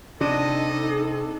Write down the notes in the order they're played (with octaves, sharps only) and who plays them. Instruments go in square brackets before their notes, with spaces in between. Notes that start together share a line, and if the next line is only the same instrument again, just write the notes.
[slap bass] C3 [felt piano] D4 [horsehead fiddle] D#4 A4 [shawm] D#5